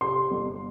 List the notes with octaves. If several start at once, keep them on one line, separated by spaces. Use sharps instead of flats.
C3 C6
G1